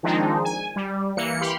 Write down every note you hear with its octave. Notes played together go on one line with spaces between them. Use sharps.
D#3 F3 G#3 C4 D4 D#4
G#5
G3
E3 A#3 C#7
G4 B5 C6 F6